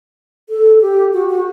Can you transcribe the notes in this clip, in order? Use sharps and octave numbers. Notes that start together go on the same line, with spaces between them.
A4
G4
F#4
F#4